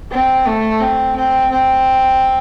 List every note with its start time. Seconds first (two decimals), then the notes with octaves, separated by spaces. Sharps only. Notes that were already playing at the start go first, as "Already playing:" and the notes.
0.12 C4
0.46 A3
0.80 C4
1.16 C4
1.51 C4